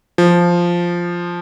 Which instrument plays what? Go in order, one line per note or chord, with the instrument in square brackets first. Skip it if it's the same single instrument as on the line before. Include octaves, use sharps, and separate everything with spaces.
[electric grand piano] F3